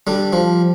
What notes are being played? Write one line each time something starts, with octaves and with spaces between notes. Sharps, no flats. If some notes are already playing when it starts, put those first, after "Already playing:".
D3 G3
F3